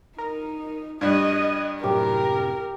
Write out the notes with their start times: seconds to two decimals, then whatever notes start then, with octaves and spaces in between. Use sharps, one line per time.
0.18 D#4 A#4
1.01 G2 G3 D#5 F#6 G#6
1.84 F#2 A2 C3 G4 A#4